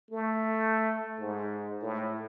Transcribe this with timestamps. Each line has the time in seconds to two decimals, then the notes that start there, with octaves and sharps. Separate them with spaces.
0.11 A3
1.19 G#2
1.82 A2